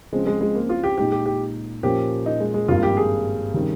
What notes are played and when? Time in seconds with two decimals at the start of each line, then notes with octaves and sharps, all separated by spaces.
0.12 C#2 C#3 F3 G#3 C4
0.27 G#3
0.41 G#3
0.55 A#3
0.69 F4
0.84 G4
0.98 A#2 G#3 D#4 G4
1.12 G4
1.26 G4
1.83 A#2 F3 A#3 C#4 G4
2.26 D#4
2.40 G#3
2.54 G#3
2.68 G#1 G2 F3 A#3 F4
2.83 G4
2.97 G#4
3.54 C3 D#3 G3 C#4